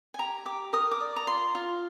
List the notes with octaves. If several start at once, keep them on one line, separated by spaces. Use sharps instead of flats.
G#5
G4 A#5
G4 D6
A#4 D#6
D6
D5
A#5
F4 C6
F4